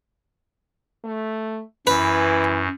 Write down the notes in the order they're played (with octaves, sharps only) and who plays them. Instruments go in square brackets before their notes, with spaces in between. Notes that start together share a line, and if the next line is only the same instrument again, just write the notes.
[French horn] A3
[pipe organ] F#2 [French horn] E3 [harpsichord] B4